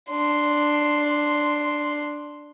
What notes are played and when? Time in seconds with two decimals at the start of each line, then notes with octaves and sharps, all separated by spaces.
0.11 D4 C6